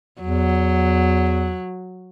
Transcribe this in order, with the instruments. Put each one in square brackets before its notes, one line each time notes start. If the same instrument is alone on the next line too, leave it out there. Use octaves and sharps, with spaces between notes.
[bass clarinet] E2 [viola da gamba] F#3